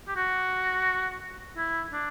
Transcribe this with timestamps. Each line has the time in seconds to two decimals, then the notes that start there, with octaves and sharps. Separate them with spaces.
0.08 G4
0.16 F#4
1.57 E4
1.93 D4